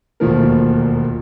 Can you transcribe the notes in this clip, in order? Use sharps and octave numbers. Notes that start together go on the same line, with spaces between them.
E1 A#1 D#2 F3 A3 A#4